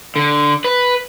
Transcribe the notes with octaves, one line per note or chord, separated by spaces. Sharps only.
D3
B4